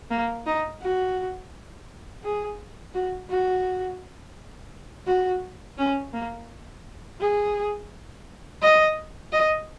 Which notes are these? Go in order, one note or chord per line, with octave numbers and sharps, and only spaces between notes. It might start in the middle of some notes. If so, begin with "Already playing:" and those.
A#3
D#4
F#4
G#4
F#4
F#4
F#4
C#4
A#3
G#4
D#5
D#5